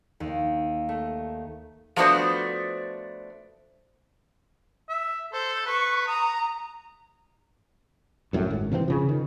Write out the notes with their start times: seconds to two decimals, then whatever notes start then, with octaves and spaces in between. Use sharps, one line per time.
0.20 D#2
0.89 A3
1.96 F3 A3 B3 D4 F#4 C5
4.89 E5
5.33 A4 C5
5.66 B4 C#6
6.08 A#5 D#6
8.33 C2 F#2 A2
8.50 G#1
8.72 C3 E3 F3 C4
8.88 C#3 F3
9.09 D#3